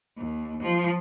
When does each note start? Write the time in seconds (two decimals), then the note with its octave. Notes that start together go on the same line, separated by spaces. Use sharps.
0.17 D#2
0.63 F3